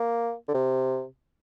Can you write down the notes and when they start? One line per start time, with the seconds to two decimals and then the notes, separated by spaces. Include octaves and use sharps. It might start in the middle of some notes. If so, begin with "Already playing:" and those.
Already playing: A#3
0.48 D3
0.54 C3